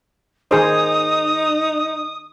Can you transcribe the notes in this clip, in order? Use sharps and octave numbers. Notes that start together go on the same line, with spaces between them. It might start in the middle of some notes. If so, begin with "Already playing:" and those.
D#3 D#4 G#4 C5 D#6